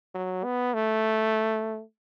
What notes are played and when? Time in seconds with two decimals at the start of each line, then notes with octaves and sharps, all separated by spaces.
0.14 F#3
0.44 B3
0.74 A3